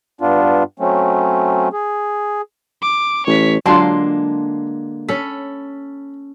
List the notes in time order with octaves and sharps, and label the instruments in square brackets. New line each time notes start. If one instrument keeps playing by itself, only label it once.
[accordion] G2 B3 D4 F4
F#3 A3 C4 C#4
G#4
[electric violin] D6
[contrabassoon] A1 [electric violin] C#5 B6
[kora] D3 G#3 A#3 [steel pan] F#3 F4 [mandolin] A5 C6
[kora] C#4 A4 [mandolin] B5